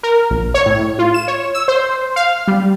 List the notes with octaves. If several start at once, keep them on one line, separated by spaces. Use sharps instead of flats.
A#4
A#1
C#5
A2
F4
E7
C#5
E6
C5
F5
G3